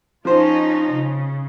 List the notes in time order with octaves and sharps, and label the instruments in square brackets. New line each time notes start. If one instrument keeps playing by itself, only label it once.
[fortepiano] F3 C5 [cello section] C#4 D#4 F4
[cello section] C#3